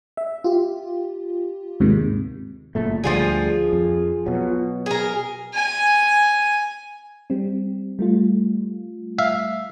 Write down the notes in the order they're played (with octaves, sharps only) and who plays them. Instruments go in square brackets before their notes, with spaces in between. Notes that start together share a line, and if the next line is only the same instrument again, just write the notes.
[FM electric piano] E5
F4 G4
D#2 G#2 C3 D#3
[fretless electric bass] F#1 A#2 A3
[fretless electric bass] D2 D3 G3 [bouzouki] F3 F4 G#4
[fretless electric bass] F2
B2 F#3
[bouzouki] G#4 A#4
[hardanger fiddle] G#5
[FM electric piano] G3 C4
G3 A3 F4
[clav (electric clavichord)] E5 F5